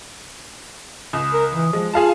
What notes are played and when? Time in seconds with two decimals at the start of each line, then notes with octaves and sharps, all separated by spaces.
1.13 C#2 D#6
1.34 A#4
1.53 E3
1.73 F3 G#3
1.93 F4 G#4 F5 A5